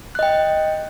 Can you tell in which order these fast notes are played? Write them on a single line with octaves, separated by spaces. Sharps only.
F#6 D#5 G5